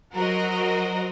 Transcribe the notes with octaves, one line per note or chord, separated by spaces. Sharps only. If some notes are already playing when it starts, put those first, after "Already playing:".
F#3 F#4 A#4 C5 D#5